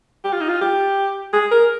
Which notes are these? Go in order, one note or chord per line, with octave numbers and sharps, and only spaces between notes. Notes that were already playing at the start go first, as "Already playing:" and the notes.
G4
F4
D#4
F4
G4
G#4
A#4